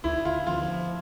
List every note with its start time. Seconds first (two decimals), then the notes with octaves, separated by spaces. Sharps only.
0.04 D2 E4
0.25 D2 F4
0.47 F3 F4